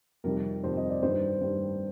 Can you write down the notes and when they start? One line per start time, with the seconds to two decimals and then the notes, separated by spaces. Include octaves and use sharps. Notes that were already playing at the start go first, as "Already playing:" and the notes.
0.24 F2 C3 D#3 G3 A#4
0.64 F2 C3 D#3 G3 C5
0.77 D#5
0.90 D5
1.02 G2 D#3 G3 C5
1.41 G2 D#3 G3